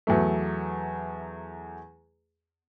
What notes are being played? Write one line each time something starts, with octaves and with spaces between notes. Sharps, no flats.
E2 F#3 A3